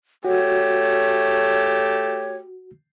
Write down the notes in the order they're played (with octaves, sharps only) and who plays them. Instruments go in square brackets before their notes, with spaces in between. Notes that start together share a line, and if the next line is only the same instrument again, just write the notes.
[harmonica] A3 [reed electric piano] F#4 [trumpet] G4 [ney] C#5